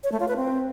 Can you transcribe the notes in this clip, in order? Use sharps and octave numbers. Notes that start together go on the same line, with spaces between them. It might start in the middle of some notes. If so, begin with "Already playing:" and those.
C#5
A3
F4
B4
C4